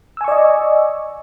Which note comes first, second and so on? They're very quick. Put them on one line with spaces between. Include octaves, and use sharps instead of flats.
E6 G#5 C#6 D5 D#5